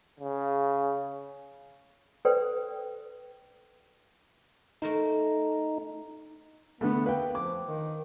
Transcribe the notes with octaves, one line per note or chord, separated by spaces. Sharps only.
C#3
A4 B4 C5 D5 G5
A3 D#4 A#4 C5
D3 A3 B3
A#3 B4 G5
F3 D6
D#3